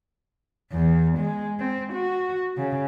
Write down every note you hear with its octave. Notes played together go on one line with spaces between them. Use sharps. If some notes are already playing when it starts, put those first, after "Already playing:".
E2
G#3
C4
F#4
C#3